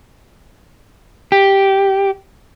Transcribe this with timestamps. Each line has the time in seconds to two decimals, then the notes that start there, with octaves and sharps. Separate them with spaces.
1.32 G4